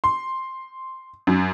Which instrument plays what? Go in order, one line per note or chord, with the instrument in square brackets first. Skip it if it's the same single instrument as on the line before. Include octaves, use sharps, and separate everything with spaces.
[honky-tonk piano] C6
F#2